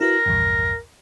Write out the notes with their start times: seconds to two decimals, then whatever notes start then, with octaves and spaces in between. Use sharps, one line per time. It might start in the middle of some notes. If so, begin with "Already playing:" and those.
0.01 E4 F#4 A#4 B4
0.26 A#1 E2 G2